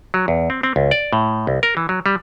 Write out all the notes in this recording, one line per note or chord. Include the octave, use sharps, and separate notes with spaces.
F#3
E2
C4
C4
C#2
D5
A2
C2
A#4
E3
F#3
G3